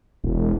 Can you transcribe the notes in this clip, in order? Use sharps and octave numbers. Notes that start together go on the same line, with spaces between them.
E1